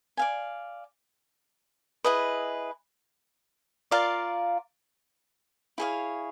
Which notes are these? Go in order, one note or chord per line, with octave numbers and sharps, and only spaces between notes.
D5 F5 G#5
E4 G#4 B4 D#5
F4 A#4 D5 F5
E4 G#4 C#5 F5